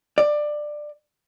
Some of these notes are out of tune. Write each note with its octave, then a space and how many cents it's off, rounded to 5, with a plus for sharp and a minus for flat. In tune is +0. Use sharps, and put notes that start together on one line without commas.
D5 +15